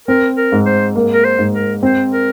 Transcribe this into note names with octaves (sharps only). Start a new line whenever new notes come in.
C4 A#4
A#4
G#2
C5
A#3
A#4
C5
G#2
A#4
C4 C5
A#4